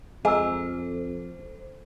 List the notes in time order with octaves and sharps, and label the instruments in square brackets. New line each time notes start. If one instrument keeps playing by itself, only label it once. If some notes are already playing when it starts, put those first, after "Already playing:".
[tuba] F2 [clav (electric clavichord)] G#3 [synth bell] A4 C5 [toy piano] G#5 A#5 E6